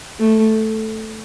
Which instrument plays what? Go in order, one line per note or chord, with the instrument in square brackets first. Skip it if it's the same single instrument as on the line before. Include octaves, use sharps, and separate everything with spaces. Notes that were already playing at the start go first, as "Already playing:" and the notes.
[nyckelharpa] A3